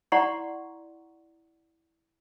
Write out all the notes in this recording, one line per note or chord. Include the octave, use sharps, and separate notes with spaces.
E4 D5 F#5 A#5 C6 C#6